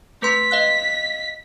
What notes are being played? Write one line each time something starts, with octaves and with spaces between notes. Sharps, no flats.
A3 B4 C6 B6
D#5 F5 F#6